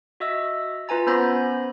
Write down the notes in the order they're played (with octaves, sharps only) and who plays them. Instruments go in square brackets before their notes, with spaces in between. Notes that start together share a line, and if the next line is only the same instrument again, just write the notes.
[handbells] F#4 D#5 E5 E6
F4 B4 G#5 A#5 A6
B3 C#4 C5 B5 G6 A#6